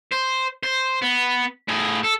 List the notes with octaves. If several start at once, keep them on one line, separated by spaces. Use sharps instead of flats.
C5
C5
B3
A2 G#4
A4